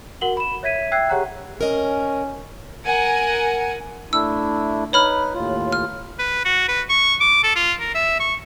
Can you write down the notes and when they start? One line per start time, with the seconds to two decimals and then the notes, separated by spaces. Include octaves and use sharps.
0.21 F#4 A#4 F#5 F#7 G7
0.37 B5 E7
0.63 C#5 E5 G#6 B6 D#7
0.92 E5 G5 E6 F#6 G#6 C7
1.09 G4 G#4 C#5 F#5 A#5 F#6
1.61 C#4 A#4 D#5
2.86 A#4 F#5 G#5
4.13 A3 D4 E4 E6
4.93 D#4 B4 C#5 B5 F6
5.34 D#2 A2 F4
5.72 F6
6.19 B4
6.45 F#4
6.68 B4
6.89 C#6
7.20 D6
7.44 A4
7.56 F4
7.80 A#4
7.95 E5
8.20 C#6